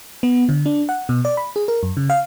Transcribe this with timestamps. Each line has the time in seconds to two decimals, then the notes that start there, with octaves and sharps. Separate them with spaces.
0.23 B3
0.49 D3
0.66 D4
0.89 F#5
1.09 B2
1.25 D5
1.37 B5
1.56 G#4
1.68 A#4
1.83 F#2
1.97 C#3
2.10 F5